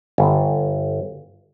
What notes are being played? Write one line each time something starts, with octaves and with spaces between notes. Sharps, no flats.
G1